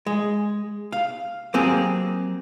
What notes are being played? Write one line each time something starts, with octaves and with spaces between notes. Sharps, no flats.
G#3
F5
F#3 A#3 C4 G4 G#4